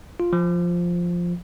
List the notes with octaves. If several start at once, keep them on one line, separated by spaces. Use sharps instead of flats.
F4
F3